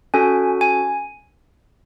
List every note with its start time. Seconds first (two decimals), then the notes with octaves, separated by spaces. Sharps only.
0.14 C#4 F#4 A4 G#5
0.61 G#5